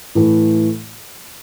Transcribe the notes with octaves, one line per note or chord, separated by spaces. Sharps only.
A2 E3 A3